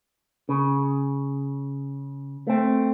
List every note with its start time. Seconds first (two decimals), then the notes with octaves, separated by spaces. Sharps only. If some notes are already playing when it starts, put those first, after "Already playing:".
0.49 C#3
2.47 A3 C4